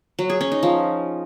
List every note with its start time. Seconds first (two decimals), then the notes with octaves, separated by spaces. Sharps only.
0.19 F#3
0.30 G#4
0.41 C#4
0.52 D#4
0.63 F3